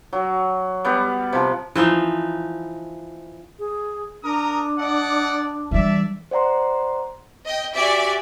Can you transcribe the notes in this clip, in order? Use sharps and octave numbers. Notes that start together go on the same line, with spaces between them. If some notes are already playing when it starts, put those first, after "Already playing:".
F#3
G3 B3
C3 F3
E3 F3 D#4
G#4
D4 A#4 A#5 D#6
D5 D#5 F#5
E3 G3 D5 E5
C5 D5 F#5 A#5 C6
D#5 G5
F#4 G4 D5 E5 G#5 D6